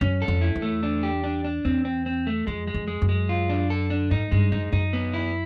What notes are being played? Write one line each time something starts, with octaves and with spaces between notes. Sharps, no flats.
F#2 C#4
A4
F2
E4
E2
A3
D4
G4
D4
D4
E2 C4
C4
C4
A3
F2 G#3
G#3
F2
G#3
F#2
G#3
F4
D4
A4
D4
G#2 D#4
G2 G#3
F#2 D#4
F#2 D#4
B3
E4